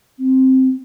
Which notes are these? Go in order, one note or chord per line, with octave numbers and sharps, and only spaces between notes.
C4